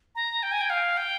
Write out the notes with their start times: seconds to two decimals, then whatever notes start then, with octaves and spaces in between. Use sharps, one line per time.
0.15 A#5
0.43 G5
0.52 G#5
0.61 G5
0.70 F5
0.97 G5